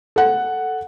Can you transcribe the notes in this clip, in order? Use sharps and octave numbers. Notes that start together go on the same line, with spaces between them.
A4 F#5